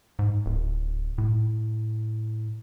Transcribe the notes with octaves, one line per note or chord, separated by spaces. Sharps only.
G#2
D1
A2